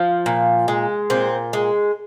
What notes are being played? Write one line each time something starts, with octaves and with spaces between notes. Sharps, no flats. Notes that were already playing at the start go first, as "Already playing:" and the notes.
Already playing: F3
A#2
G#3
A#2 C4
G#3